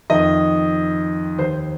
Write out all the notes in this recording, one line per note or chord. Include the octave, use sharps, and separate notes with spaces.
F2 D#3 D#5
D#2 D#3 C5